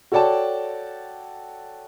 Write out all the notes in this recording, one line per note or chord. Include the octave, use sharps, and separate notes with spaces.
F#4 A4 C#5 D5 G5 A5